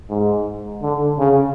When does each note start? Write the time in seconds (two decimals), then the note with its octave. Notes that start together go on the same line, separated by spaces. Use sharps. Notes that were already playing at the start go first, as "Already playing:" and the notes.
0.09 G#2
0.82 D3
1.19 C#3